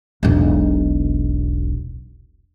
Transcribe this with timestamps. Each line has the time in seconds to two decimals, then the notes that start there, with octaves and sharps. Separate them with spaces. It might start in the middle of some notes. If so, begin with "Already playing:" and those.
0.23 E1 B1